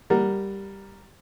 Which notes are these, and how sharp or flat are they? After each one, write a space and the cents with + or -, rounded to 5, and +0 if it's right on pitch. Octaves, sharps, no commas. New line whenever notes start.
G3 +5 A#4 +0 F#5 +0